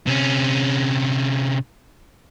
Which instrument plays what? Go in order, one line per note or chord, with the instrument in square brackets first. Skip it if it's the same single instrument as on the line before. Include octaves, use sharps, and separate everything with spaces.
[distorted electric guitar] C3 C#4